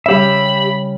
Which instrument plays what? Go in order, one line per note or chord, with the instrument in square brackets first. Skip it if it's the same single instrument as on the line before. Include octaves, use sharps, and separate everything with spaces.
[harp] C#3 G3 [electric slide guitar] G4 E5 [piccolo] B5